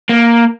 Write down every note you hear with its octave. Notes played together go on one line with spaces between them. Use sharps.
A#3